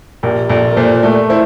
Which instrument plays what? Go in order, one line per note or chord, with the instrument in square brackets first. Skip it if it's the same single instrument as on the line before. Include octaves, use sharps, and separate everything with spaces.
[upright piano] A#1 [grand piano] G4 A#4
[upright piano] A#1 [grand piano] F4 A4
[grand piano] A#4
[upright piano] A#2 [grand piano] A4 C5
[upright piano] A3 [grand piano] A#4 D5
[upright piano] E4 [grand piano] C5 E5